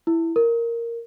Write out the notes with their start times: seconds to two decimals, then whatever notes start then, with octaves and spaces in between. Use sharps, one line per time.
0.07 E4
0.36 A#4